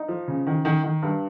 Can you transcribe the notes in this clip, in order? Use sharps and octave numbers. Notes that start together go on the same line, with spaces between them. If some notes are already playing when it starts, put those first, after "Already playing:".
Already playing: D#4
F3
C#3
D#3
D#3
D#3
G2